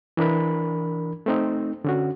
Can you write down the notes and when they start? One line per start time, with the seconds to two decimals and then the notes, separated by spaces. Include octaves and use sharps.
0.17 E3 D4 A#4 B5
1.26 A3 C4 D#4
1.85 D3 C#4 F#4